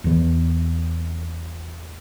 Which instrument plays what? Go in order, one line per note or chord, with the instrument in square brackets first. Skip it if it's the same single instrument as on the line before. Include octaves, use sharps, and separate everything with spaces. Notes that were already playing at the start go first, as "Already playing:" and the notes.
[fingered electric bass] E2 E3